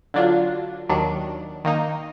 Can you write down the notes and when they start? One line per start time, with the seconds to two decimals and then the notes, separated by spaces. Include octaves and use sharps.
0.14 D3 F#3 D4 F4
0.89 D#2 D#3 F#3 D4
1.65 D#3 A#3 D#4